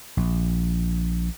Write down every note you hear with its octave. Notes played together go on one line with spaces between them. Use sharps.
A#1